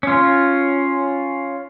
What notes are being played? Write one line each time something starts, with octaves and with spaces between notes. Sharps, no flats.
C#4 F4